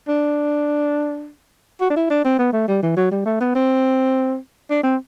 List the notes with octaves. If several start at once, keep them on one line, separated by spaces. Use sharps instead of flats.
D4
F#4
D4
E4
D4
C4
B3
A3
G3
E3
F#3
G3
A3
B3
C4
D4
C4